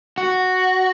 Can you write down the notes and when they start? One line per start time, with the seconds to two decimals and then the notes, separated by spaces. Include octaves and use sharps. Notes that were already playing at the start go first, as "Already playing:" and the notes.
0.18 F#4